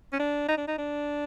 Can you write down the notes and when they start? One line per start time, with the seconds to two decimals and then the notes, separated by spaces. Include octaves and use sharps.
0.13 C#4
0.19 D4
0.49 D#4
0.58 D4
0.68 D#4
0.78 D4